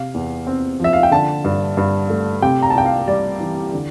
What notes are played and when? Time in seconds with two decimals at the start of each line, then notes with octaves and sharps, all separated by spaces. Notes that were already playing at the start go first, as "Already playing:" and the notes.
Already playing: C3 F5
0.14 E2
0.47 C4
0.80 F3 E5
0.93 F5
1.03 G5
1.11 D3 A5
1.44 G2
1.77 G2
2.10 A3
2.42 C3 G5
2.63 A#5
2.70 A5
2.75 C2 G5
2.86 F5
3.08 G3 D5
3.40 E3
3.73 D3